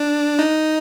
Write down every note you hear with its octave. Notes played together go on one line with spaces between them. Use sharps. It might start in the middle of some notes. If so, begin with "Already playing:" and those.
Already playing: D4
D#4